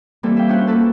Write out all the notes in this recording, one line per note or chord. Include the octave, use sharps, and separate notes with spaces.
E3 G3 A#3 C4 E4 A4
E5 F5 G5
C#4 D4 F4 F#4 B4 C5
A#3 A4 B4 A5